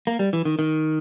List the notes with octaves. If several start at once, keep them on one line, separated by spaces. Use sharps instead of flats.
A#3
G3
E3
D#3
D#3